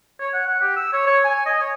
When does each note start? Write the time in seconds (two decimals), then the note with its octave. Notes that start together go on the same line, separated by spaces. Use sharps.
0.20 C#5
0.33 F#5
0.47 F#5
0.61 G4
0.76 E6
0.92 C#5
1.06 C#5
1.24 G#5
1.46 D#5
1.60 C#5